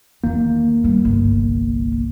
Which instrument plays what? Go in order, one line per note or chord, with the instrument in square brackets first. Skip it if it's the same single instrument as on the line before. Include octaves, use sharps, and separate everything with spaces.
[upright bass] E2 D#3 [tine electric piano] A#3
[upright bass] G3 B3
G1 C2